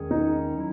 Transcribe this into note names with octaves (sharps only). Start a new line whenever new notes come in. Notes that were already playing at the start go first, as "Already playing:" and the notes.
Already playing: E2 D#3 G#3 C#4 G#4
D#4
D#3 F#3 C#4 E4